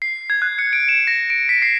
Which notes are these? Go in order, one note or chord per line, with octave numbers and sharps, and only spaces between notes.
C7
G#6
F#6
C#7
D7
E7
A#6
D7
B6
C7